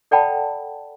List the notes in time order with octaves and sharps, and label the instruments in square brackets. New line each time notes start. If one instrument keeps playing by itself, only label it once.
[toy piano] A4 D5 F#5 G5 A5 B5